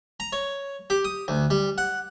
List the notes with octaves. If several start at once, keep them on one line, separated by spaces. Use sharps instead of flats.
A#5
C#5
G4
D#6
D2
G3
F#5